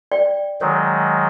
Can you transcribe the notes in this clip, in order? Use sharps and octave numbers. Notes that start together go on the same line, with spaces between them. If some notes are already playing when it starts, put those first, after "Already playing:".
D5 G5
D#3 F#3 G#3 C#5